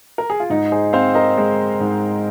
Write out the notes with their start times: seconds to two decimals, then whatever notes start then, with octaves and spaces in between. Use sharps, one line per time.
0.18 A#4
0.30 G#4
0.40 F4
0.50 G#2 D#4
0.72 G#4 C5
0.93 C4 C5 F5
1.15 A#4 D#5
1.37 G#3
1.80 G#2